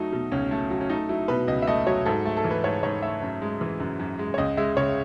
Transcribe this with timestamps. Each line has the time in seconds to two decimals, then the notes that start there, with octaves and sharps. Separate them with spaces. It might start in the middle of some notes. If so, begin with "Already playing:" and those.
Already playing: F#3 A3 D#4
0.12 B2
0.32 C#2 C#4
0.51 A3
0.70 F#3
0.81 C#4
0.89 A3 D#4
1.09 F#3 E4
1.28 B2 B4
1.48 C#2 D#5
1.62 E5
1.67 A3 D#5
1.87 F#3 C#5
2.06 G#2 A4
2.25 A3
2.37 A4
2.44 E3
2.51 B4
2.64 G#2 C#5
2.83 G#2 C#5
3.02 A3 E5
3.22 F#2
3.42 G#3
3.61 E3
3.80 F#2
4.00 F#2
4.19 G#3
4.34 C#5
4.38 C#2 D#5
4.57 G#3 E5
4.77 C#3 C#5